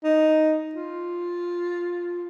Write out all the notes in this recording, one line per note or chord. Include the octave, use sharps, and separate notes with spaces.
D#4
F4